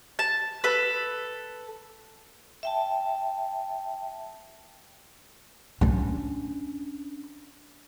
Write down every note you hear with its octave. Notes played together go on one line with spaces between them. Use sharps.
A5
A4 B4
E5 G5 A5
C#4 D4